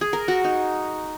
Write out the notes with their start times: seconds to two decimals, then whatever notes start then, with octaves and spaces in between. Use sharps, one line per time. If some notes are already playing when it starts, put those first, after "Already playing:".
0.01 G#4
0.13 A#4
0.28 F#4
0.44 D#4